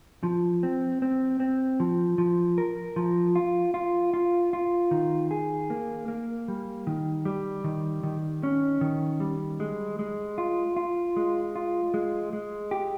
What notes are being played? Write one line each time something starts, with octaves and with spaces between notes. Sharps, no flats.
F3
C4
C4
C4
F3
F3
A#4
F3
F4
F4
F4
F4
D#3
G#4
A#3
A#3
G3
D#3
G3
D#3
D#3
C#4
D#3
G3
G#3
G#3
F4
F4
G#3
F4
G#3
G#3
G4